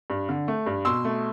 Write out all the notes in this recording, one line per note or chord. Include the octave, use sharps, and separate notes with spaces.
G2
D3
A3
G2
B2 C6 E6
A3